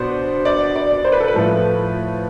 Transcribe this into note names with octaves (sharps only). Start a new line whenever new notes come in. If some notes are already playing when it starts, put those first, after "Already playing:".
Already playing: B2 B3 D4 C5
D5
D5
C5
B4
A4
B4
A2 F3 A3